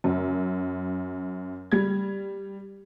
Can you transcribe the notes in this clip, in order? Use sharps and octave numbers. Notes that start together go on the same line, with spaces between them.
F#2
G3 G#6